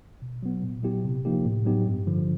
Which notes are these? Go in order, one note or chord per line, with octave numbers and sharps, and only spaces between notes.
B2
F#3 B3
A#2
F#3 B3 E4 G4
C3
F3 A#3 D#4 G4
A2
F#3 B3 D#4 G4
G2
D3 F3